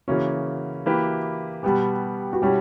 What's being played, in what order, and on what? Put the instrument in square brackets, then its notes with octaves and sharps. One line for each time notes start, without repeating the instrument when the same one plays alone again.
[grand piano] C#3 E3 A#3 C#4 [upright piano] F#4
[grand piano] E3 A#3 E4 G4 B4
[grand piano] B2 G3 B3 [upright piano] G4
[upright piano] F#4
[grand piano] B2 G3 C#4 E4 [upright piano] G4